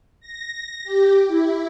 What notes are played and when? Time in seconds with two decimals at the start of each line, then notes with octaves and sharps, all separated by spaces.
0.20 A#6
0.84 G4
1.27 E4